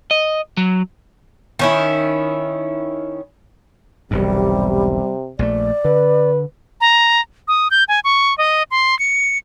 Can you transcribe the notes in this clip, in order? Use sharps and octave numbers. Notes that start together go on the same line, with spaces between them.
D#5
F#3
D#3 C#4 E4
E1 B1 G#2 C3 G3
A#1 D#3 A3 D5
D3 B4
A#5
D#6
G6
G#5
C#6
D#5
C6
C#7